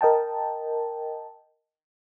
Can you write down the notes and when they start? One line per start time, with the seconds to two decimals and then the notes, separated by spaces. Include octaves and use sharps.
0.01 A#4 D#5 G5 A5